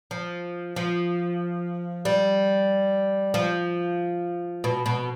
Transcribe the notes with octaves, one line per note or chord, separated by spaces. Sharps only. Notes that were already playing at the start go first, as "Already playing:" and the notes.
F3
F3
G3
F3
B2
B2